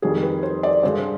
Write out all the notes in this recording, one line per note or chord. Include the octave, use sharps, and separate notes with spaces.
F2 D#3 G3 G#4
B4
C5
D5
G2 D3 G#3 C5